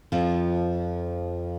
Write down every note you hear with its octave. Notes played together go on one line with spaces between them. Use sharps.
F2 F3